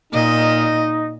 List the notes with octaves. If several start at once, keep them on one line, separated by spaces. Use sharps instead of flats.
A#2 D#4 D#5